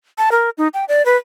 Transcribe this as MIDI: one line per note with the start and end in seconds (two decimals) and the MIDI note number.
0.18 0.30 81
0.32 0.50 70
0.58 0.68 63
0.74 0.85 79
0.88 1.05 74
1.06 1.16 71